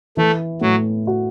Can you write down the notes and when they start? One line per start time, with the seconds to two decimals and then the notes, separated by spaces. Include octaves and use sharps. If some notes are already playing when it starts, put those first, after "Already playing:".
0.17 E3 A3
0.61 A2 F#3
1.07 F#4